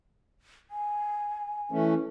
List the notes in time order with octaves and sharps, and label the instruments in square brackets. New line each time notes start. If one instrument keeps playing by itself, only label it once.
[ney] G#5
[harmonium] E3 A3 C#4